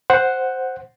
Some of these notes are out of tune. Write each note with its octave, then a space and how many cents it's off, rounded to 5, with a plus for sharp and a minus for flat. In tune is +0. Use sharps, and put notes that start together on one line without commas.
C5 +0 F#5 +0